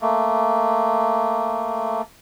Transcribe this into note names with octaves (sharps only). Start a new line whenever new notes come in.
A3 A#3